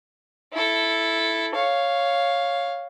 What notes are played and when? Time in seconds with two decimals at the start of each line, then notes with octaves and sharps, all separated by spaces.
0.53 E4 A4
1.55 C#5 F5